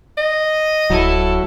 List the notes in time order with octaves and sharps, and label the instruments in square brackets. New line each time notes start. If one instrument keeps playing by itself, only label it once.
[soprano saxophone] D#5
[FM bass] D1 [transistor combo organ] F#3 [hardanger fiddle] E4 A4